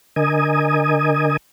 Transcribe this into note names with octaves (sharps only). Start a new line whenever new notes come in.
D3 A#4 D#5 G#5 D#6